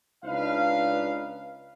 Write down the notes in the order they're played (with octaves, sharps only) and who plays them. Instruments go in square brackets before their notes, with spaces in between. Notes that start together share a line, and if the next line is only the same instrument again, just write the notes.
[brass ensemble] C#2 D4 D#4 B4 F5